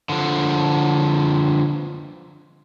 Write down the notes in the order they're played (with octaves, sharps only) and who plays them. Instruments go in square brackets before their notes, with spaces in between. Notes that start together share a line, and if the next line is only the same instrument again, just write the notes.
[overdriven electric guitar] D3 F3